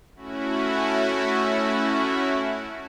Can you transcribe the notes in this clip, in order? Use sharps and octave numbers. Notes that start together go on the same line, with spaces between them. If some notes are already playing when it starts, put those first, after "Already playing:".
A3 C#4 E4 F#4